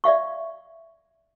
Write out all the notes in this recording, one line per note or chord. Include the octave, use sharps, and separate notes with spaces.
D5 E5 F5 C#6